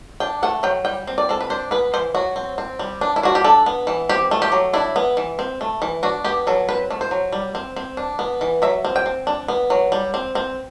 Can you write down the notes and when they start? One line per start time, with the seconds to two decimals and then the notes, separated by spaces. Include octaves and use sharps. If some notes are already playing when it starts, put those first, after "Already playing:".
0.20 D4 G5
0.43 A3 F#5
0.63 F#3 G5
0.85 G3 G5
1.07 C4
1.18 D5
1.29 C4 A4
1.41 B4
1.50 D4 C5
1.71 B3 B4
1.94 E3 C5
2.14 F#3 F#4
2.36 C4
2.58 C4
2.79 G3
3.01 D4
3.16 E4
3.23 D4 F#4
3.35 G4
3.44 D4 A4
3.66 B3
3.87 E3
4.09 C4 G4
4.31 A3
4.42 G4
4.52 F#3
4.73 D4 E4
4.96 B3
5.17 E3
5.39 C4
5.61 A3
5.82 E3
6.03 D4 F#4
6.25 B3 G4
6.47 F#3 A4
6.69 C4 B4
6.91 A3
7.01 C5
7.11 F#3
7.32 G3
7.55 C4
7.76 C4
7.97 D4
8.19 B3
8.41 E3
8.62 F#3 E5
8.85 C4
8.96 G5
9.06 C4
9.27 D4
9.48 B3
9.70 F#3
9.92 G3
10.14 C4
10.35 C4